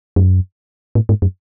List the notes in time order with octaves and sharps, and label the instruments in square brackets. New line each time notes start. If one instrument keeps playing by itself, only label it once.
[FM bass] F#2
A2
G#2
F#2